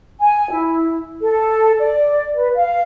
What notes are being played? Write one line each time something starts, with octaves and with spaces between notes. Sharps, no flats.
G#5
E4
A4
D5
B4
F5